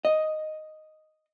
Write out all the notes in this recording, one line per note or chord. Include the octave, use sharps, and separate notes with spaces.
D#5